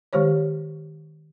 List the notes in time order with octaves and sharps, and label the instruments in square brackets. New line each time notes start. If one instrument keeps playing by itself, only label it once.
[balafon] D#3 G#3 G4 C5 C#5